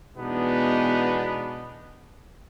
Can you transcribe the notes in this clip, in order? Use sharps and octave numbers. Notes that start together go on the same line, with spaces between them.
B2 E3 G#3 B3 D4 D#4